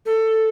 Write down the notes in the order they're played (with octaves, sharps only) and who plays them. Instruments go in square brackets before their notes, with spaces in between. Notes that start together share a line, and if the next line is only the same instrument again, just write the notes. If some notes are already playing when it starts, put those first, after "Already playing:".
[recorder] A4